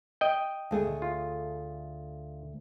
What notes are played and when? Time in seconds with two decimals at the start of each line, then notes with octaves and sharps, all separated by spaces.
0.21 D#5 G5
0.71 D2 A3 G#4
1.02 F4